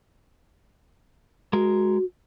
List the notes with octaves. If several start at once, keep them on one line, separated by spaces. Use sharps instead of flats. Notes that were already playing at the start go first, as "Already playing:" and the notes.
G#3 F#4 A#4